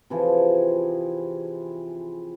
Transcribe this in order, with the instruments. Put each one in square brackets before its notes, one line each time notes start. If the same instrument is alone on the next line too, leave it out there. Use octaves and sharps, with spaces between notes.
[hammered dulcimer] C3 E3 F3 G#4